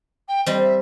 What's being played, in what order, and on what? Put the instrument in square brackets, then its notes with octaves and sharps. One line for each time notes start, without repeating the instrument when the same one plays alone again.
[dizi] G5
[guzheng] G3 C4 [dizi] D#5
[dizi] E5